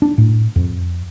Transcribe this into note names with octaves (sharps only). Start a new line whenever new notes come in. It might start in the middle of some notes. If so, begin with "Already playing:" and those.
D4
A2
F2